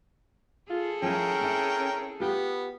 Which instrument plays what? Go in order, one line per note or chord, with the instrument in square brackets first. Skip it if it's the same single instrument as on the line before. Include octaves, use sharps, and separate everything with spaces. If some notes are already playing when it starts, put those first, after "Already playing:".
[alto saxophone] F4 [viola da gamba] G#4 A4
[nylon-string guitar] F3 E4 [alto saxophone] C#4 [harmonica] A#4 G5
[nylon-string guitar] C4 E4
[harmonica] B3 [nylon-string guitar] F4 G4